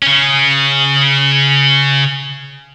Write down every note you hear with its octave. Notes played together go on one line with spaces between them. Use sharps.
C#3 C#4